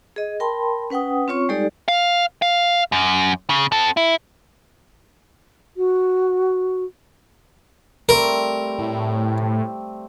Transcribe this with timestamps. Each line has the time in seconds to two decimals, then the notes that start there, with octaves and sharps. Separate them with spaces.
0.16 G#4 D#5
0.40 A#4 G5 A5 B5 C6
0.90 C#4 B4 F#5 G5 D#6
1.28 C4 F4 C#5 C#6
1.49 G3 G#3 D#4 G4 A4 D5
1.88 F5
2.42 F5
2.92 F#2
3.50 C#3
3.72 C4 A4
3.97 E4
5.77 F#4
8.09 G3 A3 C4 A#4
8.79 A2